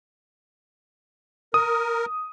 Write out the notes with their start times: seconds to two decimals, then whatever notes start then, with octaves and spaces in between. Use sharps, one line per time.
1.54 A#4 D#6